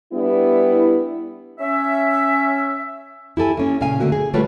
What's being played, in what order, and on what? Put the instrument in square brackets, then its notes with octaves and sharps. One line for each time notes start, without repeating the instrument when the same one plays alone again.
[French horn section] G3 B3 D4 E4
[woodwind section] C#4 E5
[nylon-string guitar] E4 G4 A4 G#5
A#3 C#4
A#2 C#3 C#4 F5 G#5
D3 A3 A#3 F#4
G#4
D3 G3 A3 F4 B4 C#5